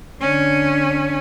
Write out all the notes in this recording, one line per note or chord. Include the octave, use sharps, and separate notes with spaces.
D3 C#4